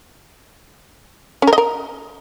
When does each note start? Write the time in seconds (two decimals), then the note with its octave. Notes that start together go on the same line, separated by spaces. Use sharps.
1.42 C#4
1.47 A#4
1.53 D#5
1.58 A#4